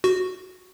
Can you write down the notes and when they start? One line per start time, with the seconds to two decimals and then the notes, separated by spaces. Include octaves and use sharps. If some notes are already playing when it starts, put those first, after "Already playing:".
0.04 F#4